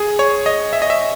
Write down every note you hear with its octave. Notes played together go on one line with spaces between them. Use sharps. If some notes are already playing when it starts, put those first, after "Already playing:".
Already playing: G#4
C#5
D#5
E5
D#5
E5